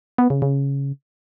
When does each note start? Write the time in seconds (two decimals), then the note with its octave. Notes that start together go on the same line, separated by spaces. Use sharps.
0.18 B3
0.30 C#3
0.42 C#3